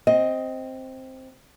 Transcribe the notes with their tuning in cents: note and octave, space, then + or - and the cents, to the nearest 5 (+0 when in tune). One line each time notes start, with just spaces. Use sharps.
C4 +0 D#5 +15